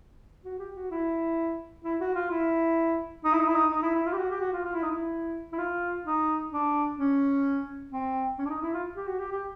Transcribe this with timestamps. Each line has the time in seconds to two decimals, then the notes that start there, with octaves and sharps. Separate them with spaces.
0.45 F#4
0.59 G4
0.76 F#4
0.91 E4
1.84 E4
2.00 F#4
2.15 F4
2.31 E4
3.24 D#4
3.33 E4
3.40 D#4
3.48 E4
3.55 D#4
3.72 D#4
3.82 E4
3.95 E4
4.06 F4
4.13 G4
4.18 F#4
4.30 G4
4.41 F#4
4.53 F4
4.65 F4
4.75 E4
4.83 D#4
4.92 E4
5.52 E4
5.59 F4
6.05 D#4
6.51 D4
6.99 C#4
7.91 C4
8.39 C#4
8.45 D4
8.50 D#4
8.62 E4
8.74 F4
8.96 G4
9.07 F#4
9.19 G4
9.32 G4